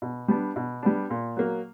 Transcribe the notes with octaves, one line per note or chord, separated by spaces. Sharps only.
B2
G3 B3 D4
B2
G3 B3 D4
A#2
F#3 A#3